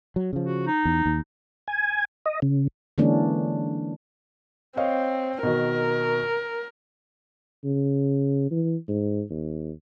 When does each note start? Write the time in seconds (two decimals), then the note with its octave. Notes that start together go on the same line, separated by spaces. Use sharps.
0.16 F#3
0.33 C#3 F3
0.44 F#4
0.67 D#4
0.85 E2
1.06 D#2
1.68 G#5
2.26 D#5
2.42 C#3
2.98 D3 E3 G#3 A#3 C#4 D4
4.77 C4 C#5 D#5 F5
5.43 B2 D#3 A#4
7.65 C#3
8.51 E3
8.88 G#2
9.30 D#2